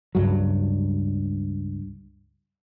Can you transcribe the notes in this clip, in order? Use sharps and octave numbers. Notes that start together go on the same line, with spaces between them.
C#2 G2 F#3